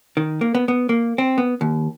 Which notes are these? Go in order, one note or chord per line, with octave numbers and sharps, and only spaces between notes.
D#3
A#3
B3
B3
A#3
C4
B3
D#2